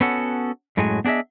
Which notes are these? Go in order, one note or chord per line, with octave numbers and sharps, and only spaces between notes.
B3 C#4 F#4 A4 F#5
F#2 A2 F#3 G#3 F#4 G#5
B3 D4 G#4 D#5 E5